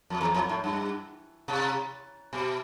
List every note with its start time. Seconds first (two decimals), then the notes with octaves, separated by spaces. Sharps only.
0.10 F2
0.21 E2
0.34 F2
0.49 A2
0.64 G2
1.48 C3
2.33 B2